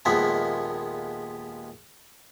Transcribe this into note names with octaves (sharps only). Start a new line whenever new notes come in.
A#1 D#2 F3 G#3 B3 E5